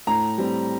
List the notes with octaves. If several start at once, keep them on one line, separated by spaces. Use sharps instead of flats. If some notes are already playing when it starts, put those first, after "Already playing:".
A2 A#5
G3 C4